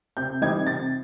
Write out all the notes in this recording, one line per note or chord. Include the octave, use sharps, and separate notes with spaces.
C3 G6
E3 G3 C4 D#4 G#6
C3 A6